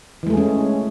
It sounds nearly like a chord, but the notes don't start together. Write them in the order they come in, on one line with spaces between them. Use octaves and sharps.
E3 G#3 A3 G#4 C#4